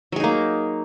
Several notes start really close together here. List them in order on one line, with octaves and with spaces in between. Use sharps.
F#3 G#4 D#4 A#3